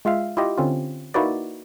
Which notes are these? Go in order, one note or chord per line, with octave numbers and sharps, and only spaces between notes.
G#3 F4 E5 F5
E4 F4 G4 D#5
D3 C4 C#4 F4
A#3 D#4 E4 F#4 B4 D5